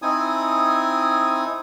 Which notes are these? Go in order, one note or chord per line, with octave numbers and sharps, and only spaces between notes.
C4 D#4 E4 G#5 D#6